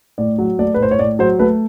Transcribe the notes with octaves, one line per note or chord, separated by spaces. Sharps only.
A2 D5
F#3
A3 D5
B4
A2 C5
C#5
A2 D5
F#3 C5
A3 B4